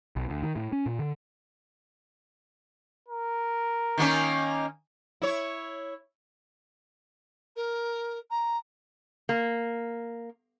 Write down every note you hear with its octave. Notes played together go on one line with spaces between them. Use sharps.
B1
D2
D#3
A2
C#4
A#2
D3
A#4
D#3 A#3 C#4
E4 C#5
A#4
A#5
A#3